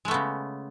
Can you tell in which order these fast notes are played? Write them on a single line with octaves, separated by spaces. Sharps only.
G#3 A3 B3 C#3